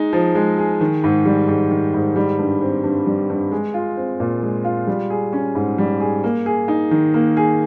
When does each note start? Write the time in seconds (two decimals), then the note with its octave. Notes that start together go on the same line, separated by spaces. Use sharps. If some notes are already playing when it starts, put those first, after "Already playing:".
Already playing: G#3 D#4 G#4
0.13 F3
0.35 G#3
0.58 G#4
0.81 D#3
1.04 G#2
1.25 G3
1.48 G#2
1.71 D#3
1.94 G#2
2.16 G3
2.39 G2
2.61 C4
2.84 G2
3.07 G3
3.30 G2
3.51 G#3
3.74 F4
3.97 C4
4.20 A#2
4.42 G#3
4.64 F4
4.87 G3
5.10 G#4
5.33 C#4
5.55 G#2
5.78 G3
6.00 G#4
6.24 A#3
6.46 G#4
6.68 D#4
6.91 D#3
7.14 A#3
7.37 G#4